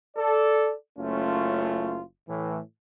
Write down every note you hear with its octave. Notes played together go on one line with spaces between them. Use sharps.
A4 D5
F#1 A3 C#4 F4
A2 E3